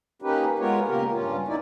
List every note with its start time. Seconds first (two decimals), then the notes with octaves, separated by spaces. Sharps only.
0.22 A#3 C#4 D#4 G4 B4
0.59 G#3 B3 F4 A#4 C#5
0.88 A#2 C#3 A#3 G4 A#4
1.11 G2 C#4 F4
1.48 E2 D#4 E4 D5